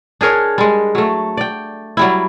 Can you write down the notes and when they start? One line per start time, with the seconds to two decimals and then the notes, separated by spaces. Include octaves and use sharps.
0.21 D4 G#4 A#4 C#5
0.58 G3 G#3
0.95 F#3 A3
1.37 D5 G5
1.97 F#3 G3 E4